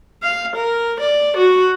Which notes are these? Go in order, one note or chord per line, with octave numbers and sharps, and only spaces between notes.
F5
A#4
D5
F#4